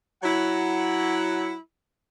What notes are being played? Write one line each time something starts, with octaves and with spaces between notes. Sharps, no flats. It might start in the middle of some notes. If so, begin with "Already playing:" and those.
F#3 E4 F#5